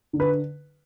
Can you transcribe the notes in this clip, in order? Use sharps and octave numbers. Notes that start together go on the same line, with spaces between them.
D3
B4